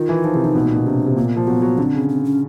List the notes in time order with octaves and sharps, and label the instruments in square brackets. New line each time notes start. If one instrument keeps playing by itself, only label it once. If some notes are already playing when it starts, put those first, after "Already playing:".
Already playing: [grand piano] D#3 [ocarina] F4
[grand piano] E3
[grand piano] F3 [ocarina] D#4
[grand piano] C3 [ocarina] E4
[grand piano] C3 [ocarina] D#4
[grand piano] B2
A#2
B2
[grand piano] C3 [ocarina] D4
[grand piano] C3
[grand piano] A#2 [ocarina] A#3
[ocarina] B3
[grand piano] F3 [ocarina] A#3
[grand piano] F#3 [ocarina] B3
[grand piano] F#3
[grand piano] D3 [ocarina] C4
[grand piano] C#3
[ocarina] C4
C#4